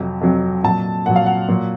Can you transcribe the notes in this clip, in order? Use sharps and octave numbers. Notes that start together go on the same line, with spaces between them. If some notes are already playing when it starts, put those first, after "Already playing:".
Already playing: F2 C3 F#3
F2 C3 F#3
A#2 F#3 A5
A#2 F#3 F#5
F5
F#5
A#2 F#3